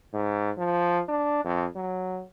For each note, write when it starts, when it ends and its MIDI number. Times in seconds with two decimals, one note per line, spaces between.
0.13 0.50 44
0.57 1.01 53
1.08 1.41 62
1.45 1.66 41
1.76 2.22 54